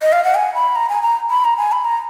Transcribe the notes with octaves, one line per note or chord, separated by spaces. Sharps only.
D#5
F5
F#5
G#5
B5
A#5
G#5
A#5
B5
A#5
G#5
B5
A#5